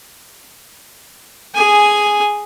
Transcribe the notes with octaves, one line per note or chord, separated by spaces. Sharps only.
G#4 G#5